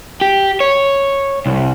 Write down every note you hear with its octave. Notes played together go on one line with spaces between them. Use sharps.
G4
C#5
C2